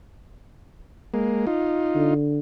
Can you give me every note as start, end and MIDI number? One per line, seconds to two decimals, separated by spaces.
1.14 1.46 56
1.14 1.46 58
1.47 2.14 63
1.47 2.14 65
1.95 2.39 50